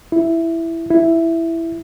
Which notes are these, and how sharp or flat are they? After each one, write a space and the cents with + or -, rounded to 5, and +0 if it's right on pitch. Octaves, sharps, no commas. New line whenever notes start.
E4 +5
E4 +5